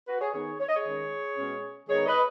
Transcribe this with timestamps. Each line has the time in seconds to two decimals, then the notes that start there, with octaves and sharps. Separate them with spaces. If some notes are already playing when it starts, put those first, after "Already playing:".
0.08 F#4 B4
0.21 G#4 C#5
0.34 D#3 B3 D#4 G#4 C#5
0.60 C#5
0.68 D#5
0.75 G#4 C#5
0.86 D#3 G#3 C#4
1.37 B2 G#3 C#4
1.89 D#3 G#3 B3 D#4 G#4 C#5
2.06 B4 D#5